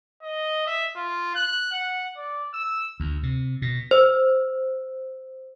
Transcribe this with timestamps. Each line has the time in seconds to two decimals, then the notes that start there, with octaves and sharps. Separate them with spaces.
0.23 D#5
0.67 E5
0.96 F4
1.35 F#6
1.72 F#5
2.17 D5
2.54 E6
3.00 D2
3.23 C3
3.62 B2
3.91 C5 E6